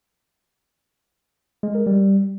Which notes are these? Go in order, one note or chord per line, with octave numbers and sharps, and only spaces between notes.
G#3
A#4
G3